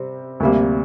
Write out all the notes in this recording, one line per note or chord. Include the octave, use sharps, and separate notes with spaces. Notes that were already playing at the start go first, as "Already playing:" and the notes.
Already playing: C3 G3 C4
D2 C3 G3 A#3